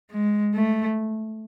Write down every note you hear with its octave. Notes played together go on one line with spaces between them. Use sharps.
G#3
A3